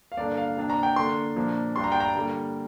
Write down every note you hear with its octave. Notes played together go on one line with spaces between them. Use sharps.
F5
G2 D3 A#3 D4 D5
F5
C3 A#3 D4
A#5
G5
D3 A#3 D4 C6
A#2 F3 A#3 D4
G2 G3 D4 C6
A#5
G5
A#5
D3 G3 A#3